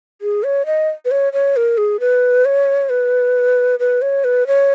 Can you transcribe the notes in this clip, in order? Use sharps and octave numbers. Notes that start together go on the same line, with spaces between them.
G#4
C#5
D#5
B4
C#5
C#5
A#4
G#4
B4
C#5
B4
B4
C#5
B4
C#5